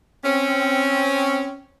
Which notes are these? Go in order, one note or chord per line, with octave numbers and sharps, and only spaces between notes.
C4 C#4